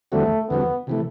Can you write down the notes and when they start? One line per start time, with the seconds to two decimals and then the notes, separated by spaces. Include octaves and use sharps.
0.12 E2 D3 G3 A3 C4 F#4
0.49 E2 D3 G3 B3 C4 F#4
0.87 C3 E3 A3